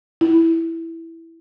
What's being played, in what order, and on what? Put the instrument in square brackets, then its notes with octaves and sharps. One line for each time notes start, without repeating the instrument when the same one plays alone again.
[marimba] E4